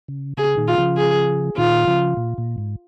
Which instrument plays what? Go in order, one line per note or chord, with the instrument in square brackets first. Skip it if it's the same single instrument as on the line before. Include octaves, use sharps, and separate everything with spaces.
[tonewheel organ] C#3
[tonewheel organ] C#3 [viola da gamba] G#4
[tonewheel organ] A#2 D#3
[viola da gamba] F4
[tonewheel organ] C#3 F3
[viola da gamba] G#4
[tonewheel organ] A#2 D#3 [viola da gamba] F4
[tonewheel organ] C#3 F3
A#2
A#2
G#2